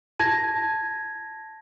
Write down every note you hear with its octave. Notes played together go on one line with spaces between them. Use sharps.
A5 G#6 A#6